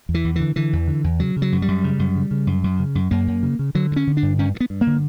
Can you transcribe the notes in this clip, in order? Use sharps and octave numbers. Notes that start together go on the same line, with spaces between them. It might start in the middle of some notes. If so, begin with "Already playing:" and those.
E2
E3
E2
D3 E3
D3 E3
E2
D3
E2
C#3 F#3
C#3
F#3
F#2
G3
F#2
C#3
F#2
C#3
C#3
F#2
F#2
C#3
F#2
F#2 A#3
F#2
C#3
C#3
D3 F#3
G2
C#4
D3
D4
G2
G2 C#4
G2
B3
G2
A#3
D3